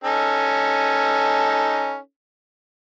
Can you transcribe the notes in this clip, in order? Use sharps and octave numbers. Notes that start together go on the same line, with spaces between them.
C#4 D#4 A4